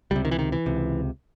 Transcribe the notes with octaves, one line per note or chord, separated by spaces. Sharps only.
C#2 C3 G3
D#3
E3
D#3
E3
C#2 C3